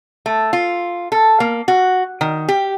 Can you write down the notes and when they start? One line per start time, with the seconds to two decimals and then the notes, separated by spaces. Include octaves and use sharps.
0.26 A3
0.53 F4
1.12 A4
1.40 A#3
1.68 F#4
2.21 D#3
2.48 G4